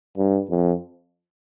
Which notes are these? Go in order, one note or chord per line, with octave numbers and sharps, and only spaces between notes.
G2
F2